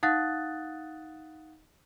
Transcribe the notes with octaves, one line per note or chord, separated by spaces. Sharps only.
D#4 F5 F#5 D#6 F#6 A6